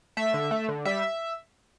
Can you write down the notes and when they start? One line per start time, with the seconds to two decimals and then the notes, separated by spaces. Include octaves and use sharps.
0.17 A3 E5
0.34 D3
0.51 A3
0.69 D3
0.85 G3 E5